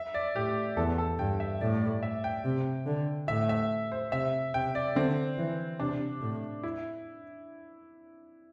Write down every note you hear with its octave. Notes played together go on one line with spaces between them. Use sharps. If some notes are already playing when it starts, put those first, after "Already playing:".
Already playing: E5
D5
A2 G4
E2 A4
A4
G2 G5
E5
A2 D5
D5
E5
G5
C3
D3
A2 E5
E5
C5
C3 E5
C3 G5
D5
D3 C4
E3
C3 D4
A2
E4